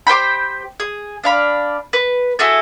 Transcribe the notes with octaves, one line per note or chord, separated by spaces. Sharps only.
G4 C5 G5 B5
G#4
D4 F5 B5
B4
E4 F#4 G#4 A4